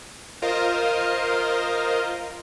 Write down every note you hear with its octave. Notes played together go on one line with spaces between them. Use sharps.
F4 A#4 C5 D#5 F5